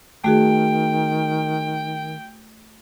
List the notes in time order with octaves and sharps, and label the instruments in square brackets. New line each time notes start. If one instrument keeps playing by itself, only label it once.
[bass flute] D#3 [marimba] A3 F#4 G#4 [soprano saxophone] G5